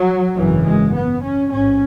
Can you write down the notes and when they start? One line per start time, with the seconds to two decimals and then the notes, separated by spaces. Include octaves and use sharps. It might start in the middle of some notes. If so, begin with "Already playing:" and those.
Already playing: F#3
0.37 G#1 F#2 C#3 E3
0.65 G#3
0.94 B3
1.22 C#4
1.50 A1 G#2 C#4